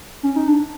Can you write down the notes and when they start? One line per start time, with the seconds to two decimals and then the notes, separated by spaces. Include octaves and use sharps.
0.23 C#4
0.36 D#4
0.48 D4